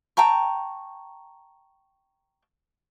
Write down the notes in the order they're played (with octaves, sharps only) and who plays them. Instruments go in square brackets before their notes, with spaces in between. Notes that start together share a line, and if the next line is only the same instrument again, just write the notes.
[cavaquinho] G5 A5 A#5 C#6